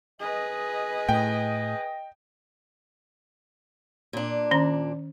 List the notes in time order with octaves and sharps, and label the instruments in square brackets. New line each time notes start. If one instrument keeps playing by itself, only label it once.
[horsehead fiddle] G#4 B4 [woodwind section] D#5
[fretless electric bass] A2 [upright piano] G5
[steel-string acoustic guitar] A#2 D4
[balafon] D#3 C#4 A#5